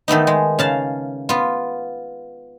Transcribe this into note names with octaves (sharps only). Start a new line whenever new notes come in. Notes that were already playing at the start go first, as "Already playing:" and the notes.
D#3 A3 B3 D#4
G#3
C#3 F5 A5
B3 F4